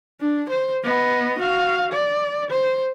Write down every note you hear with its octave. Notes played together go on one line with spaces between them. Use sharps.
D4
C5
B3 D#5
F#4 F5
D5
C5